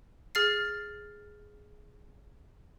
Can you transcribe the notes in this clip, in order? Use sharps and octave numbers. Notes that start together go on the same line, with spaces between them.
G#4 F6 A6 C7